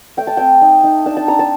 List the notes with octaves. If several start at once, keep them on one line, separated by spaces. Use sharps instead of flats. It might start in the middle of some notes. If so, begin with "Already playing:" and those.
A3 G5
A5
C4 G5
D#4
D#4
D4 A5
A5
D4 A#5
A5